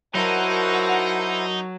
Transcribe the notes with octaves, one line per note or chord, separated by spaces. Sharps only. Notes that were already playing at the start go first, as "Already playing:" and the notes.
F#3 D#4 E4 A#4 C5 F#5 A5